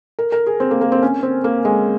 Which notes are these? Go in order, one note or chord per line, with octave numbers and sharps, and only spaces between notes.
A#4
A#4
G#4
C4
A#3
A#3
C4
C#4
C4
A#3
G#3